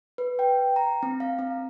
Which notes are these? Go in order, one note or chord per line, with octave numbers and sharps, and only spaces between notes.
B4
G5
A#5
C4
F5
C4